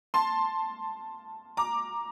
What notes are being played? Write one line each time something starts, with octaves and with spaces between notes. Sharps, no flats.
A5 C6
A#5 D6